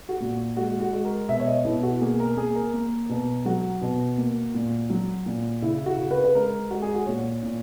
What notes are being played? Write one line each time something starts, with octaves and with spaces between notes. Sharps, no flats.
F#4
A#2
G#3 F#4
F#4
G#3
A#4
B2 E5
C#5
D#5
B2 E4
F#4
A#3 G#4
A#4
A#3 G#4
A#4
A#3
B2
F#3 F#4
B2
A#3
A#2
F#3
A#2
C#3 E4
F#4
C#3
B4
B4
G#3 A#4
G#3 F#4
G#4
F#4
A#2 C#5
A#2